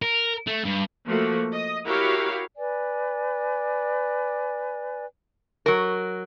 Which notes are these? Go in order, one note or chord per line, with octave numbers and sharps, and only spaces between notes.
A#4
A3
G2
F3 A3 A#3 F#4
D#5
E4 F#4 G4 A#4 C#5 F5
B4 D5 G#5
F#3 A#4